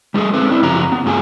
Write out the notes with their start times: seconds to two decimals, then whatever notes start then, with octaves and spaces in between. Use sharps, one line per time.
0.14 G3 F4 F#4 G#4 A4
0.33 C4 A4 B4
0.50 C4 E4
0.62 F#2 C#3 F3 G4 A#5
0.92 B3
1.06 G2 A3 F4 G#4 A4 G#5